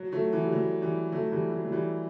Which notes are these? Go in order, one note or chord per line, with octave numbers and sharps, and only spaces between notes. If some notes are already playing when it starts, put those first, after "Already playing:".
Already playing: F#3
F#3 A3
E3
G3
F#3
E3 G3
F#3 A3
E3 G3
F#3
F#3
E3 G3